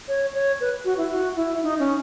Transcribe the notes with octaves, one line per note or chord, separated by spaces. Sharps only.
C#5
C#5
B4
F#4
E4
F#4
E4
D#4
C#4